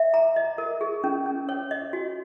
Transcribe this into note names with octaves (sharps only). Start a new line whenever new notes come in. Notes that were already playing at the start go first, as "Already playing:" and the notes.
Already playing: E5
A#5
D#5
A#4
G#4
C#4
C#4
C#5
D#5
F#4